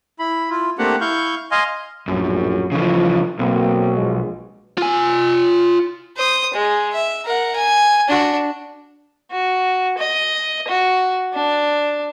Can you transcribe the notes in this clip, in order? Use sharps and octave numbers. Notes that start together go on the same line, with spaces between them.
E4 B5
E4 F4
A3 A#3 C4 D4 G4 F#5
E4 F5 C#6 G6
D#5 F5 G#5 C6
A#1 F#2 A2
C#3 E3 F3
B1 A#3 C4
A#1 F3 G#3
F4 G#5
C5 D#6
G#3
E5
A#4 F#5
G#5
D4 F#4
F#4
D#5
F#4
D4